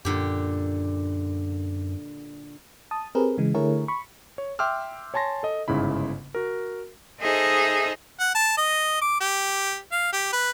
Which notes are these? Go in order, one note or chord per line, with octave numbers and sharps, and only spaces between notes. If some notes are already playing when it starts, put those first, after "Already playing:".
F#2 A#2 D3 G4
A5 D#6
C4 G4 G#4 A#4 B4
C#3 E3 G#3
D3 A3 E4 G#4 A#4 C#5
B5 C#6
C#5
E5 G5 C6 D6 E6 F6
C#5 G#5 A5 C6 A#6
A4 D#5
G1 G#2 C#3 E4 B5
F#4 A#4
D#4 G#4 A4 C5 D#5 E5
F#5
A5
D#5
D6
G4
F5
G4
B4